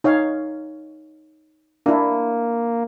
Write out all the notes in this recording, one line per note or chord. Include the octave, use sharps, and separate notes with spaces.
D#4 C#5 F5
A#3 D4 E4